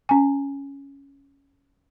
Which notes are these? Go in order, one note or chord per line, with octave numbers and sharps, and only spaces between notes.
C#4 G#5